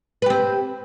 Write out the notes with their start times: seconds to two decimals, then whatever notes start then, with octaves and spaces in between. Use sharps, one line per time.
0.22 B4
0.26 G4
0.30 C4